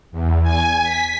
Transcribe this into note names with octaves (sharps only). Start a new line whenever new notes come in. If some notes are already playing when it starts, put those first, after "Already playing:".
E2
G#5
B6